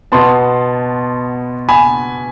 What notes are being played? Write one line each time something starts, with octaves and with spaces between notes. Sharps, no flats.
B2 B3 A5 C6
G#5 B5